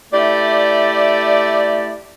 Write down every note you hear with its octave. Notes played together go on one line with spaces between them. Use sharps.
A3 E4 G4 D5